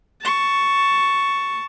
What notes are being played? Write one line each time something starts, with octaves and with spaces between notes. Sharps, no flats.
A5 C#6